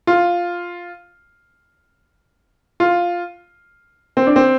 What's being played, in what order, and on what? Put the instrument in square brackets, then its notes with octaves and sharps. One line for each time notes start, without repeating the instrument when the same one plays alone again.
[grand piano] F4
F4
C4
D4
C4